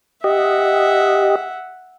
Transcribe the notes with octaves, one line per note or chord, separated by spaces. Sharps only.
G4 D#5 E5 F#5